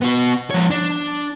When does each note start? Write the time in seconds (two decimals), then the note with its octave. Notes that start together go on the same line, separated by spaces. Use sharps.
0.01 B3 F#4
0.51 F3 C#5
0.71 D4